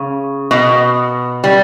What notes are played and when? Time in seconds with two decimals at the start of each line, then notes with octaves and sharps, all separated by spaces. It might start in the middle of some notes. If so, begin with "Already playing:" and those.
Already playing: C#3
0.51 B2
1.44 G3